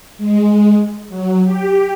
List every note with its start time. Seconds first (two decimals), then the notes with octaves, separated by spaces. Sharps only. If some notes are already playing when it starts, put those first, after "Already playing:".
0.18 G#3
1.08 F#3
1.45 G4